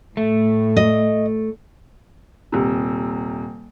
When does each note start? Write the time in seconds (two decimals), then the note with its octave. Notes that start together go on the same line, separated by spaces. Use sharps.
0.17 A2 A3
0.77 D#5
2.52 D#1 C3